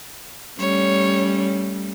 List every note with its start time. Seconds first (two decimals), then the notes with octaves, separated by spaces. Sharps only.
0.59 G3 A3 C#4 C#5